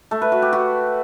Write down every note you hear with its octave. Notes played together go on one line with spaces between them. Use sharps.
A3
B4
F#4
G4
F#4